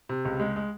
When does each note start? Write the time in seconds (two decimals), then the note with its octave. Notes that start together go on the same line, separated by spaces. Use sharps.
0.09 C3
0.25 C#2
0.40 G#3
0.56 G#3